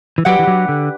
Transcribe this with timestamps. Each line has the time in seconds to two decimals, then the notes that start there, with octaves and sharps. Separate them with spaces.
0.18 E3
0.25 F#3 D4 G4 B4 F#5
0.39 E3
0.47 F#3
0.69 D3